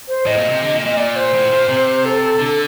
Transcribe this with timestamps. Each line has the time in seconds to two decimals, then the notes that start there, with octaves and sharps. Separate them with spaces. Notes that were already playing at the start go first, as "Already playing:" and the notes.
0.08 C5
0.26 A2 D#5
0.38 A#2
0.50 C3
0.62 D3
0.73 A#2
0.86 A#2
0.97 A#2 D5
1.16 C5
1.34 A2
1.51 A#2
1.68 C3
2.05 A4
2.40 D3